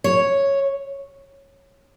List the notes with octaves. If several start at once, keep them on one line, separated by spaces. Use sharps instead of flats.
C#5